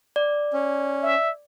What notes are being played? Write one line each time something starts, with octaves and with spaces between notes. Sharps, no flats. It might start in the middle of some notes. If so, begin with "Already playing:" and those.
D5
C#4
E5